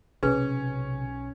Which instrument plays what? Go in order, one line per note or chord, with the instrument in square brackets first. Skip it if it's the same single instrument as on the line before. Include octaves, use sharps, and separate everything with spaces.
[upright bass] B1 [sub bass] C3 [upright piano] C#4 [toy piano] G#4 B4